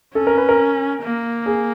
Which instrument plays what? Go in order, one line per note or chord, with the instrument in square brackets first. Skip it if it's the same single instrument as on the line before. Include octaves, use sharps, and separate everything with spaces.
[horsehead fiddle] C#4 [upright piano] A4
[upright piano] A#4
B4
A#4
[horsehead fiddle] A#3
[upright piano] G#4